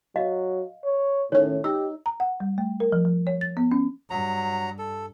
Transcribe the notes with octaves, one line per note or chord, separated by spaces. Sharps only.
F#3 D#5 F5
C#5
A2 D#3 C#4 C#5
D#4 G4 E6
A#5
F#5
G3
A3
A#4
F3
F3
C#5
A6
B3
C#4
G2 F#3 A#5
A4